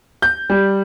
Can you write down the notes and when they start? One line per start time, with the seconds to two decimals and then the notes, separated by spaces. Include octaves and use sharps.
0.22 G6
0.50 G3